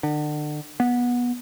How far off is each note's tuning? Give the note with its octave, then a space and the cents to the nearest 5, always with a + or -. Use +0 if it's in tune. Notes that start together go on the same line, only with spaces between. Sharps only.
D3 +35
B3 -20